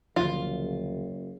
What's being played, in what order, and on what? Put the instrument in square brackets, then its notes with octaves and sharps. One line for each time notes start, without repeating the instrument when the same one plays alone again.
[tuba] F#1 [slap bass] D2 B2 F3 [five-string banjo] F4